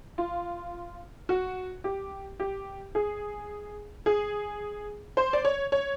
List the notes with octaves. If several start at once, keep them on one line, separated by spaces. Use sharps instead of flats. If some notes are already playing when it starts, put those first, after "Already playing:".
F4
F#4
G4
G4
G#4
G#4
C5
D5
C#5
C#5